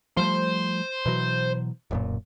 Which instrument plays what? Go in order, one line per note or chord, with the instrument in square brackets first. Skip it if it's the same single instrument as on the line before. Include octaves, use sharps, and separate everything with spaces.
[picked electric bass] F3 G3 A3 [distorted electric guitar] C5
[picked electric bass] B2 E3 F#3
D1 F#2 A#2